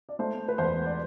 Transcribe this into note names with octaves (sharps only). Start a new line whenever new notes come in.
D5
A3 C5
B4
E2 C5
D5